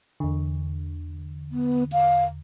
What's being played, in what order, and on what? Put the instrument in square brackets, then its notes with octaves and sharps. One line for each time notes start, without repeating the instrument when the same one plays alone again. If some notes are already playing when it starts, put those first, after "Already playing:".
[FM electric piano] E2 D3
[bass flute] B3
F5